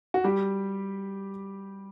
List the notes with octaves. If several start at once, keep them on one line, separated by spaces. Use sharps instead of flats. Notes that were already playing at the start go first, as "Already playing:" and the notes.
F#4
G3 G4